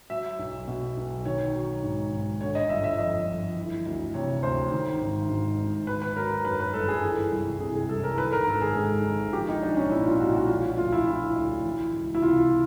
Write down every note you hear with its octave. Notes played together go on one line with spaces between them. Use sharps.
F#3 E5
B1
B2
B1
D#3 C#5
F#3
G#2
G#1
D3 C#5
D#5
G1 E5
E5
F2 D#5
G1
E3
D2
C3 C#5
D2 C5
D#3
G#1
G#2
G#1
D#3 B4
B4
F#3 A#4
A#4
F#2 B4
B4
G1 A4
G#4
E3
C2
C3 G#4
G#4
C2 A4
A#4
D#3 B4
A#4
G#1 A4
G#4
G#2
G#1
F3 G4
D#4
B1 D4
C#4
A#2 E4
F4
B1 F#4
F#4
F3 F4
D2 F4
E4
D3 E4
D2
E3
C#2
E4
C3 F4